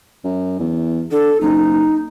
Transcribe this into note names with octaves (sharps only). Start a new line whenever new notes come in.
F#2
E2
D3 A4
F#1 D#4